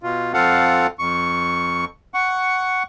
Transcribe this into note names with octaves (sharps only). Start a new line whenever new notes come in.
B2 F4
F2 C4 F4 A4 F5 F#5
F2 C#6
F#5 C#6